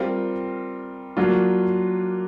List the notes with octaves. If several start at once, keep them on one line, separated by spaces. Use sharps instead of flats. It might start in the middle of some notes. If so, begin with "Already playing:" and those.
Already playing: G3 C4 F4 A#4
F#3 A#3 D4 F4